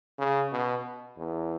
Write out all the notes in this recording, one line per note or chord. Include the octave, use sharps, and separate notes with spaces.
C#3
B2
E2